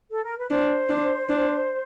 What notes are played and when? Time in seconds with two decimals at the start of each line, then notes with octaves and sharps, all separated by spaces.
0.12 A4
0.24 A#4
0.37 B4
0.50 D4 C5
0.89 D4
1.30 D4